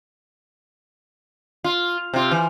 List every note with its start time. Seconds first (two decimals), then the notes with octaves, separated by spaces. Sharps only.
1.64 F4
2.14 C3 F4
2.31 E3